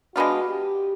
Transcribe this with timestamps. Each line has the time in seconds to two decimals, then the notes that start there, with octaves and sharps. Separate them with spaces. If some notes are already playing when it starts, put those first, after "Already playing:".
0.15 G#3 B3 D4 F4 F#4
0.49 G4